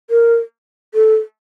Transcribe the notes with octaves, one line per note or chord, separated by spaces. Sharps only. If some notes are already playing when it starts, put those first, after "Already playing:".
A#4
A4